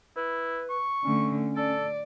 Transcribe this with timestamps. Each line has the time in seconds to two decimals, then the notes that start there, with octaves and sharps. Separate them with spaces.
0.16 E4 B4
0.70 C#6
1.04 D3 A3 C#4
1.56 A4 D5